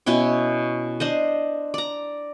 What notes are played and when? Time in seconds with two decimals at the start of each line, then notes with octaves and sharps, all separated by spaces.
0.06 B2 C#4 E4 G5
1.00 D4 C5 D#5
1.74 D5 A#5